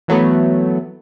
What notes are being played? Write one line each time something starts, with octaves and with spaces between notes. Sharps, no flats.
E3 F#3 A3 B3